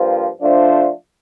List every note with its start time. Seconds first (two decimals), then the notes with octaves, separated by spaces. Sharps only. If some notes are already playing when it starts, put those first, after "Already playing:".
Already playing: G2 F3 A#3 F4 C5
0.40 F3 A3 D4 F4 C5